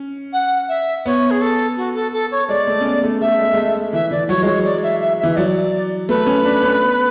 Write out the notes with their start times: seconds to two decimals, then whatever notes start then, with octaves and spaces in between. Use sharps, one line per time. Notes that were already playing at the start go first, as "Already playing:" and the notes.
Already playing: C#4
0.33 F#5
0.69 E5
1.06 B3 C#5
1.31 G#4
1.41 A4
1.77 F#4
1.95 A4
2.13 A4
2.31 C#5
2.49 G#3 D5
2.67 A3
2.81 C#4
2.85 B3
3.03 A3
3.21 A3 E5
3.39 G#3
3.52 G#3
3.57 A3
3.93 E3 E5
4.11 E3 D5
4.29 F#3 C#5
4.42 G#3
4.46 F#3 C#5
4.65 D5
4.83 E5
5.00 E5
5.19 E5
5.23 E3
5.32 E5
5.36 F#3 D5
6.09 A3 B4
6.26 C#4
6.45 D4
6.63 C#4
6.81 B3